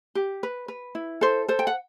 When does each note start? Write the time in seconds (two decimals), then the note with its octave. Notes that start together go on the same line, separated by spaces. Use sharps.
0.15 G4
0.43 B4
0.68 B4
0.95 E4
1.21 A4 C5
1.48 A4 C5
1.59 G5
1.67 F#5